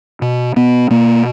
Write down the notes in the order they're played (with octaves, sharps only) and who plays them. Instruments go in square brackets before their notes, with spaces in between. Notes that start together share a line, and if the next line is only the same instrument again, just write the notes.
[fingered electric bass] B2
B2 B3
B2 A#3